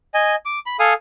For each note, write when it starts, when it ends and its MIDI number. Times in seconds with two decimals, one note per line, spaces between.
0.14 0.35 75
0.14 0.35 80
0.45 0.59 86
0.66 0.77 83
0.80 0.93 69
0.80 0.93 77
0.80 0.93 80
0.80 0.93 87